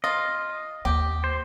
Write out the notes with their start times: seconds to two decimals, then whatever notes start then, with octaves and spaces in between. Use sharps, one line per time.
0.04 F4 D#5
0.85 D#2 G4
1.24 C5